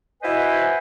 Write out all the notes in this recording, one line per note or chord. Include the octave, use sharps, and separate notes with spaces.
E4 F#4 B4 C5 D#5 G#5